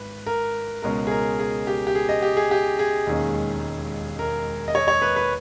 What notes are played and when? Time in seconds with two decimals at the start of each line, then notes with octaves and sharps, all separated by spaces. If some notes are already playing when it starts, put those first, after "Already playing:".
Already playing: G#1 B4
0.26 A#4
0.82 C#2 B2 G#3 C#4 A#4
1.07 G#4
1.11 A#4
1.39 G#4
1.67 G4
1.87 G4
1.95 G#4
2.09 D#5
2.22 G4
2.37 G#4
2.51 G4
2.79 G#4
3.06 E1 D#2 D#3 G#3 C#4
4.19 A#4
4.68 D#5
4.75 C#5
4.88 C#5
5.02 B4
5.16 B4